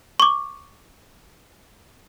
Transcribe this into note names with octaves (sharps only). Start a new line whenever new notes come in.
C#6 D6